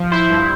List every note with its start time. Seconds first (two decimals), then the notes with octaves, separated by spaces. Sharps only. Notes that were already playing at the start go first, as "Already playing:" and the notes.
Already playing: F3
0.11 E4 C5
0.30 G2